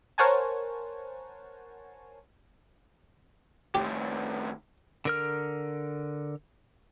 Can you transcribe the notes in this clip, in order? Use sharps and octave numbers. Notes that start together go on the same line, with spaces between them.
A#4 C5 C#5 F#5 G#5 A5
A2 D#3 G4
D3 A#4 F6